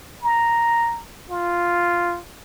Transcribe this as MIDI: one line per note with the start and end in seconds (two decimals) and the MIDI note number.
0.23 1.00 82
1.30 2.19 65